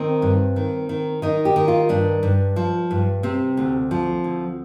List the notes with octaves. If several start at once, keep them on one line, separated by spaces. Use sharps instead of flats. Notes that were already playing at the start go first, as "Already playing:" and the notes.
Already playing: D#3 C4
G2
D#3
D#3
D#3 D#4
G4
D#3
F4
G2 D4
G2
F3
G2
C3 C4
D2
F3
D2